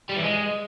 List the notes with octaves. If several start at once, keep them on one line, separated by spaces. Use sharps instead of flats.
G3
E3
G#3